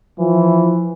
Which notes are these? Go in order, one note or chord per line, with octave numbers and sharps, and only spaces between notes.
E3 F3